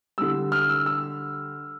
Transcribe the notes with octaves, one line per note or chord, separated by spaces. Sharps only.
D3 G3 E6
F6
E6
E6